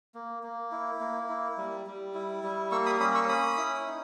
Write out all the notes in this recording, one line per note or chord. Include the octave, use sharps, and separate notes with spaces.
A#3
A#3
E4
A#3
E4
G3
G3
E4
G3
A#3 C#6 E6
B5 D#6
C#4 B5 D#6
C#6 E6
C#4 B5 D#6
E4
D#4